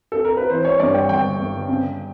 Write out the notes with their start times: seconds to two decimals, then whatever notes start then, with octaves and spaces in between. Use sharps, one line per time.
0.12 A4
0.25 A#4
0.37 B4
0.50 E3 C5
0.65 C#5
0.80 G2 D5
0.94 G5
1.09 G1 G5
1.39 G1
1.68 C#3